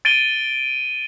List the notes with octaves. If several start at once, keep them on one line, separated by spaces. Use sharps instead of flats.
A6 D7 D#7 G7